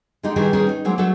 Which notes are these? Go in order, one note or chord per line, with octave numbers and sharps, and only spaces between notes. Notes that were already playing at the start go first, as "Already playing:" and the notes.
D3 G#3 D#4 G4
D#3 E3 G3 D#4 G#4 A#4
D#3 G3 C#4 G#4 A#4
D#4
F#3 G#3 A#3 C4
F#3 A3 D4 A4